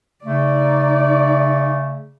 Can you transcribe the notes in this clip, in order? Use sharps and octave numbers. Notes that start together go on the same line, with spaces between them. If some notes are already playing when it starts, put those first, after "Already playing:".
C#3 A3 D#4 D5